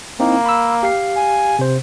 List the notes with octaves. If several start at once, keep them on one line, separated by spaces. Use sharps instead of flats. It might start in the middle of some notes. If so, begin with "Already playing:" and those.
A#3 C4 D#4 E4
B5 E6
G4 F5 C7
G#5
C3 C5